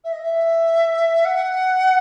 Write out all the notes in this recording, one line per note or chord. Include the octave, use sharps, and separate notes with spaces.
E5
D#5
E5
F#5